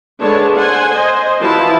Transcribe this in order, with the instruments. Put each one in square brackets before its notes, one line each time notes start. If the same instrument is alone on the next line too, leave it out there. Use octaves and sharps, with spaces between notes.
[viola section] D3 G#3 D4 B4 C#5 A5
C5 F#5 G#5
C5 D#5
E3 F3 E4 F#4 A5